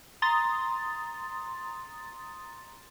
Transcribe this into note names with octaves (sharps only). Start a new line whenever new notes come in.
A#5 C6 D#6 A6